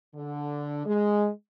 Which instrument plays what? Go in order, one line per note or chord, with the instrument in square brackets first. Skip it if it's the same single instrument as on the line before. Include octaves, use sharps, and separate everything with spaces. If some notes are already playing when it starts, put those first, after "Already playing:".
[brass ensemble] D3
G#3